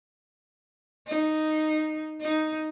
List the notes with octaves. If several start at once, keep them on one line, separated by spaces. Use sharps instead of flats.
D#4
D#4